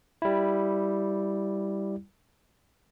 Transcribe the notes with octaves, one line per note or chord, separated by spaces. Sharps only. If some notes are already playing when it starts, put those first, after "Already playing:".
G3 E4